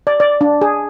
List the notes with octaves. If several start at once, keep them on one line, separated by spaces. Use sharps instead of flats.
D5
D5
D4
G#4